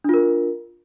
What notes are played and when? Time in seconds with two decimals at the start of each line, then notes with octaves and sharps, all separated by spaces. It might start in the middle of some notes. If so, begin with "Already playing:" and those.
0.04 D4
0.09 F4
0.14 A#4